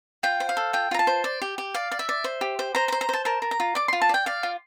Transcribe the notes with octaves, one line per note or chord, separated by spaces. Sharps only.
F4 G5
C5
F5
A4
F4 G5
F4 A#5
A5
C5
D5
G4
G4
D5 F5
D5
E5
D5
C5
G4
C5
C5 A#5
A#5
C5
A#5
C5 A5
A#4 A5
A#4
A#5
F4
D5 D6
F4 C6
A5
D5 G5
D5 F5
F4